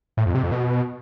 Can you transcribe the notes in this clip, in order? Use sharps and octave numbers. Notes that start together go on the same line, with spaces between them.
A2
F2
C3
F2
B2